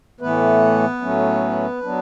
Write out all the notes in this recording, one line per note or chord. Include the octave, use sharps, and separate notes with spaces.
A2 E3 A3 B3 B4
A2 F#3 A3 C#4
F#3 B3 D4